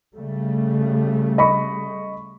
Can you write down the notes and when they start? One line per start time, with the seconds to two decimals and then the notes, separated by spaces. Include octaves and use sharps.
0.16 C#3 G3 A3
1.38 D#5 B5 C#6